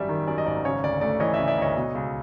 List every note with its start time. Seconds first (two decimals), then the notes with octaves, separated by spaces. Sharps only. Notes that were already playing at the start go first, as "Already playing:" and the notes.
Already playing: G#1 F#2 G3 D5 E5
0.09 D#3
0.27 F#2 D5
0.38 D#5
0.46 G#1 D5
0.65 C#3 C#5
0.84 D2 D5
1.01 A3 D5
1.20 E3 C#5 D#5
1.34 C#3 D5 E5
1.48 D5 E5
1.58 D2 C#5 D#5
1.76 B2
1.95 C#2